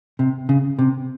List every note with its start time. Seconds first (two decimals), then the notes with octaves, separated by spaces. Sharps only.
0.19 C3
0.49 C#3
0.79 C3